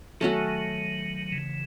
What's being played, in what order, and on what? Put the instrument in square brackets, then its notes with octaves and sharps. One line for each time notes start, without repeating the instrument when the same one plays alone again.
[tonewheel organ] D#3 F#3 [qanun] A3 C#4 F#4 A4
[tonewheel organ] C#3 E3